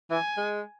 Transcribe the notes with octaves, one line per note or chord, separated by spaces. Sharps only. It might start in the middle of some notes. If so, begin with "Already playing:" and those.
E3 G#5
G#3